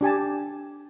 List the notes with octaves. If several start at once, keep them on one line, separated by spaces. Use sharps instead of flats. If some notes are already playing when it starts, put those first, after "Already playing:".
D4 G4 G#5 A5